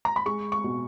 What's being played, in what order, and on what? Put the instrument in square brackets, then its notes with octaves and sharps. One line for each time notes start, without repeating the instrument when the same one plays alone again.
[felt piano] A#5
B5
G#3 C#6
C#6
B2